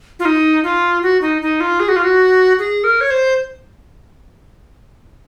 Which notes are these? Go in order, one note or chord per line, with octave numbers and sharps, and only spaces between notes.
F4
D#4
F4
F#4
D#4
D#4
F4
G#4
F#4
F4
F#4
G#4
A#4
C#5
C5